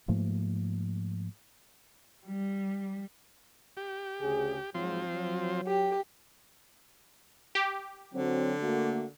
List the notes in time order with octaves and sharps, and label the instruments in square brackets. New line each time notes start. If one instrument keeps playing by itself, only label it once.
[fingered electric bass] G#2 F3 A3 A#3
[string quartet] G3
[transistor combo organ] G4
[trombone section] D2 C#3 G#4
[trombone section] G#2 F#3 [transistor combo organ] F3 C4
[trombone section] F#3
[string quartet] G4
[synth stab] G4
[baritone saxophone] D3 [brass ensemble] F#3 C4
[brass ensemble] A3 A#3 F#4